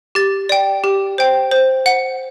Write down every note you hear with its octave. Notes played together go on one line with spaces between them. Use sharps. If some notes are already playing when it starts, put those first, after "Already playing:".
G4 A6
D5 G5
G4
C5 G5
C5
F#5